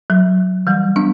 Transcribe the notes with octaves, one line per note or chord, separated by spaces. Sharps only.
F#3
E3 G3
B3 D4